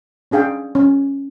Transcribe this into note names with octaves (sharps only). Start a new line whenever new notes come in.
C#4 D4 G#4 F5 G5
C#4